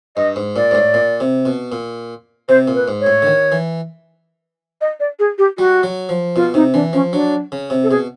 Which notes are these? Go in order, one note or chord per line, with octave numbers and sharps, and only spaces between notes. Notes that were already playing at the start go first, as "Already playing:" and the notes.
G2 D#5
G#2
A#2 D5
G#2
A2
A#2
C3
B2
A#2
C3 C5
A#2
B4
G#2
C#5
A2
D3
D#3
E3
D#5
D5
G#4
G4
G3 F#4
F#3
F3
B2 F4
C3 D#4
E3 D4
F3 C#4
F#3 D4
C#3
C3
A4
B2 G#4